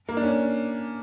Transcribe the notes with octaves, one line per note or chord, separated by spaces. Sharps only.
A#3
D4
C#4